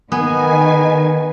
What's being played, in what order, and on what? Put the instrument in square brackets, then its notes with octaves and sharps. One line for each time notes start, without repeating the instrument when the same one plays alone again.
[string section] D#3 G#5 [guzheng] B3 G#4